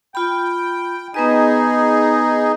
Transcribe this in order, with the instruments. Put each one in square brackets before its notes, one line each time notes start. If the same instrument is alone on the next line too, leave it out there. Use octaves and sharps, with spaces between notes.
[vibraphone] F4 B5 [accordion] G5
[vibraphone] B3 B4 D#5 [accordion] D#4 G#4